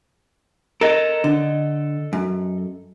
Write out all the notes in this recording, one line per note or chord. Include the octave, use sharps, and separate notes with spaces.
A4 A#4 D#5
D3
F#2